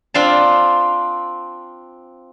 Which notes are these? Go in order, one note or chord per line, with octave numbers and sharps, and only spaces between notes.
C4 D4 F4 F5 A5